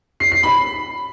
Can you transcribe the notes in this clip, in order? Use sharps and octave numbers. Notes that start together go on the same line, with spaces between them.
C7
C7
B5